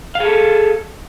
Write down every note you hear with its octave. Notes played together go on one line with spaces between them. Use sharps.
G#4 A4 F5